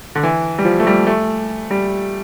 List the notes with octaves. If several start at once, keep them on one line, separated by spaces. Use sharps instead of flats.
D3
E3
G3
F3
A3
G3
A3
G3